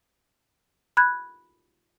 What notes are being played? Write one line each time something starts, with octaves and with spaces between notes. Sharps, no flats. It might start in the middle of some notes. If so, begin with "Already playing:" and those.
B5 F#6 G#6